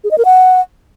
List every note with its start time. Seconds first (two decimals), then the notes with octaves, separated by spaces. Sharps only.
0.04 G#4
0.11 D#5
0.18 A#4
0.25 F#5